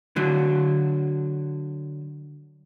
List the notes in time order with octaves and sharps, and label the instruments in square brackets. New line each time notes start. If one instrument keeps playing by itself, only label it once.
[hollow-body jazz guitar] D3 F#3